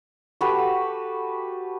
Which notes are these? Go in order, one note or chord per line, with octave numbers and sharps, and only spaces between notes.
F#4 G4 A4 B4